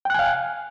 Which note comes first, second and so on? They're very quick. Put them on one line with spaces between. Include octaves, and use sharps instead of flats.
G5 F#6 G#5 F5